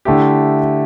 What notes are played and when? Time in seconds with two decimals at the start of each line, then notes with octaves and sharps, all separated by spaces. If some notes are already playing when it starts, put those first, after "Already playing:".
0.05 D3 A3 E4 G4